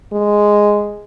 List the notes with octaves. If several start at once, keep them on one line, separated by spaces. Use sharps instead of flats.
G#3